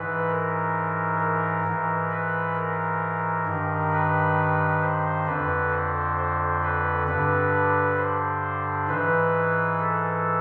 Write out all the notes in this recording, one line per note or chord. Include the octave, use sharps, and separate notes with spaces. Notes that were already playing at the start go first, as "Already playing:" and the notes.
Already playing: G#2 E3 B4
A#4
A#4
G#2 E3
B4
A#4
G2 D#3
B4
C5
F2 D3 B4
C5
C5
B4
G2 D3 B4
C5
G#2 E3 B4
A4